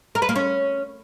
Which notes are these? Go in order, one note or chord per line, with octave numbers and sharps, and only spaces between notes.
A#4
B4
A#3
C#4